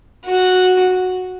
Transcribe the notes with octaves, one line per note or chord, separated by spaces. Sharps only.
F#4